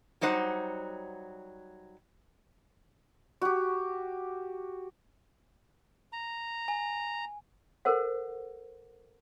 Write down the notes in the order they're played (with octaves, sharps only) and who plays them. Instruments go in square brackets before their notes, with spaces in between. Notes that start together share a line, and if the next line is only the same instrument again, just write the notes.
[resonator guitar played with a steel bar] F#3 G3 D#4 C5 F#5
[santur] F#4 G4
[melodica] A#5
[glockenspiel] G#5
[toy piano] A4 A#4 C5 F#5